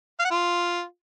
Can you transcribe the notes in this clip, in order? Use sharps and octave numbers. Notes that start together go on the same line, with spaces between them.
F5
F#5
F4